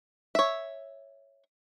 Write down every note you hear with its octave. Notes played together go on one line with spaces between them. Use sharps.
C#5 E5